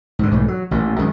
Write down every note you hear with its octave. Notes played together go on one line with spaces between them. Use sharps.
G#2 D3
B1 G#2 E3 A3
F#3
A1 A#2
F#2 D#3 G#3